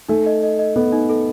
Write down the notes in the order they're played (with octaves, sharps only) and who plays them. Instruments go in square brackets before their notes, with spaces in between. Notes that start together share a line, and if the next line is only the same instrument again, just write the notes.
[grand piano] A3 [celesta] D#4
[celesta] D#5
D#5
D#5
[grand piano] B3 [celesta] A4
[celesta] D#4
A4